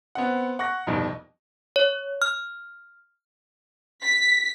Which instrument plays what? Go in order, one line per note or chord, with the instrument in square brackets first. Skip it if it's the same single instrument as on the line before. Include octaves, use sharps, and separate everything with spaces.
[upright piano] B3 C4 F#5
F#5 C#6 F#6 A#6
C2 F2 B2 D#4
[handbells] C#5
F6
[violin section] B6